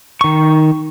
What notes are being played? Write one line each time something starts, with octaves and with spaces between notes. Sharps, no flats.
D#3 C#6